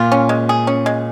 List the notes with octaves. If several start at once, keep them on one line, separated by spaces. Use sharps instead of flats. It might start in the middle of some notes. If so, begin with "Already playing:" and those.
Already playing: A#2 F4
C#4
G#3
G#4
C#4
G#3